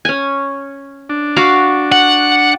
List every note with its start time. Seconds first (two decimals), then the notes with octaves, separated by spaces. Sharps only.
0.05 C#4 G#5
1.09 D4
1.36 F#4 F5 D6
1.92 F#5